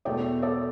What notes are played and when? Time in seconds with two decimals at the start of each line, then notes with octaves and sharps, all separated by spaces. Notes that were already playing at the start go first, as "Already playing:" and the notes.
0.05 E2 B2 A3 D5 G5
0.43 A4 D5